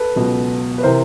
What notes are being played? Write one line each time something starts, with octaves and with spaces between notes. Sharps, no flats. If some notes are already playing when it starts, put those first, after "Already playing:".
Already playing: A4 B4
C#2 B2 F#3
B4
C3 E3 A#4 C5